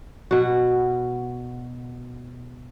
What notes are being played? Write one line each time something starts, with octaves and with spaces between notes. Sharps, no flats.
B2 F#4